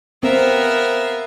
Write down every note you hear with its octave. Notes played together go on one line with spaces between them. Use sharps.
B3 C4 A#4 E5 F5